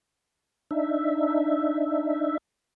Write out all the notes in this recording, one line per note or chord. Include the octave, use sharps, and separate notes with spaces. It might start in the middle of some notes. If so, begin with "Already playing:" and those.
D4 D#4 E5